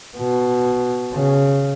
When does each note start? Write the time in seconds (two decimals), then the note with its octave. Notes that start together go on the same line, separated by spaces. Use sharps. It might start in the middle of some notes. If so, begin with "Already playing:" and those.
0.18 B2
1.14 C#3